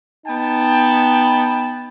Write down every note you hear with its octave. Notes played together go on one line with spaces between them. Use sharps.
B3 D#4 G5 A5